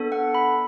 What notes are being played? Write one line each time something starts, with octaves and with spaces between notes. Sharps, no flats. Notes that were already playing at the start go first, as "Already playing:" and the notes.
Already playing: B3 D4 A4
F#5
B5